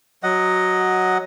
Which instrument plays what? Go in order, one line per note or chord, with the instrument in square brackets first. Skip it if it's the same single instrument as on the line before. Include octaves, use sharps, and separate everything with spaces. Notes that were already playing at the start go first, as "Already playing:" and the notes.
[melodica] F#3 D#5 F#5